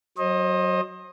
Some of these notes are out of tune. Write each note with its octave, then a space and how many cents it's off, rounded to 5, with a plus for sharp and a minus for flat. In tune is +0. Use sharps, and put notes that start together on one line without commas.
F#3 +0 C5 +35 D#5 +0